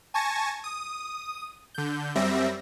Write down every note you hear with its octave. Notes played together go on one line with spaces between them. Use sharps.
G#5 A5 C#6 G#6 A#6
D#6
D3 G6
F#2 G3 C4 E5 A#6